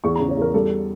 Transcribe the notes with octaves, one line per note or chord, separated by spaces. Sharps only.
E2 C#6
A#5
C#3
C#5
E2 A#4
G3 A4